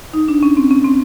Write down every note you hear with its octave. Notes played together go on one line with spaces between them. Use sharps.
D#4
D4
C#4
C4
C#4
C4